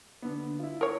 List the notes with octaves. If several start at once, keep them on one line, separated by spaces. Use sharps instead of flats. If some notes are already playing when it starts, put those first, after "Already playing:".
D3 B3
E4 F4
A#4 C#5